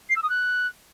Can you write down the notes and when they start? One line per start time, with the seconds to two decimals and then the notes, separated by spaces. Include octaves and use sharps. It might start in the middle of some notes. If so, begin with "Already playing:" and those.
0.09 C7
0.16 E6
0.23 D#6
0.30 F#6